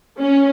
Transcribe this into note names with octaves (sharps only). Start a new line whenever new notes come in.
C#4